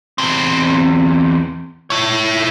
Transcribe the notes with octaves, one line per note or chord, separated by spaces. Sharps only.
E2 C4
E4 C#5